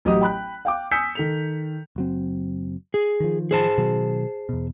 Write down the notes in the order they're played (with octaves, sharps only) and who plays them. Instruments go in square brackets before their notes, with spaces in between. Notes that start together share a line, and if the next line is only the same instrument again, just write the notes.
[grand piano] A1 F#3 G4 D#5 D#6
G5 B5 F#6
F5 G5 D6
G#5 D#6 E6 G6 B6 C#7
D#3 A4 F7
[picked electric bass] F#1 F#3 C4
[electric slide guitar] G#4
[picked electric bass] D#3 F3
[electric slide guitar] G#4 C5 A5
[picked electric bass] B2 D#3 F#3
E2 B2